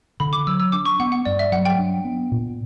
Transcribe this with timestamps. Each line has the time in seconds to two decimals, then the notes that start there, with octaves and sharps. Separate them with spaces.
0.20 D3 B5
0.33 D6
0.47 F#3 E6
0.60 E6
0.72 D4 D6
0.85 C#6
1.00 B3 F#5
1.12 F#5
1.25 G2 D5
1.39 E5
1.52 F#3 F#5
1.65 G5
1.79 D4
2.04 B3
2.32 A#2